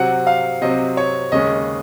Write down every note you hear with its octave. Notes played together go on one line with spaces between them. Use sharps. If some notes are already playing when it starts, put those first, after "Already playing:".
Already playing: C3 F#3 C4 F#5
F5
C3 F#3 C4 D#5
C#5
D#2 C#3 G#3 C#4 D#5